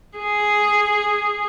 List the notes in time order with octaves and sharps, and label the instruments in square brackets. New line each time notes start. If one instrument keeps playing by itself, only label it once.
[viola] G#4